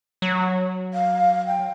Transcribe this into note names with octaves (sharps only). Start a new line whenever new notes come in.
F#3
F5
G5